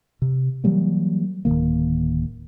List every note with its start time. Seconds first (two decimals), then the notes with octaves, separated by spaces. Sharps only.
0.22 C3
0.64 E3 F#3 G3 A#3
1.45 D1 G1 D#3 A#3